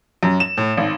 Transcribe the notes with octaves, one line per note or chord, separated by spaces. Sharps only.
F#2
E7
A2
G#1